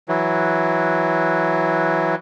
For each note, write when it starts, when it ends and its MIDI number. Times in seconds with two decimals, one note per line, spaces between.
0.09 2.15 52
0.09 2.15 54